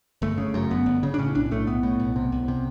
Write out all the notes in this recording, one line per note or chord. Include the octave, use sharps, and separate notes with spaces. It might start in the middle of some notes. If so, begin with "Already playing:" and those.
G1 A3
C#3
F#2
G1 B3
G1
C#3
D4
A2 C#4
B1 D4
A2 A3
B1 B3
A2
B1
C3
C2
C3